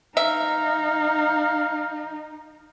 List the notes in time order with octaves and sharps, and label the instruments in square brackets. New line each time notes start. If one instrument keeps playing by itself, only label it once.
[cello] D#4 [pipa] E5 [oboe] F5